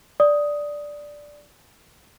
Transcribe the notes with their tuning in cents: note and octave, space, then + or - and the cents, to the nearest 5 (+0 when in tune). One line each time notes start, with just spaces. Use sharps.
D5 +0 D#6 +10